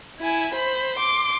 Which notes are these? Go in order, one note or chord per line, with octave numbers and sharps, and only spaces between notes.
E4 G#5
C5 B5
C6 D6